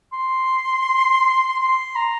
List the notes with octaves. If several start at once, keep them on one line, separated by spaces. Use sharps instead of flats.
C6
C6
A#5